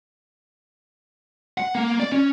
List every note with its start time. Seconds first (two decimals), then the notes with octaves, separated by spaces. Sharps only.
1.58 F#5
1.75 A#3
2.00 D5
2.12 C#4